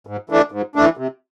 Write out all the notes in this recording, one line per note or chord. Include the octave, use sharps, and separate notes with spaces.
G#2
E3 A3 D4
G#2
E3 A3 D4
C3